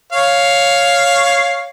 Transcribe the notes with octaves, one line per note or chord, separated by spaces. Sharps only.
C#5 F5